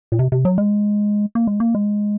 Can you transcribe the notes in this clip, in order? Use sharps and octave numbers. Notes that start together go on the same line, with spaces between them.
A#2
C3
C3
F#3
G#3
A#3
G#3
A#3
G#3